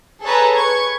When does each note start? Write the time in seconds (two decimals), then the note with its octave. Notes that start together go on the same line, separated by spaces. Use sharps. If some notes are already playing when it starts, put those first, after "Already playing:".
0.22 G#4 A4 B4 C#5 A5 A#5
0.55 B4 C#6 G#6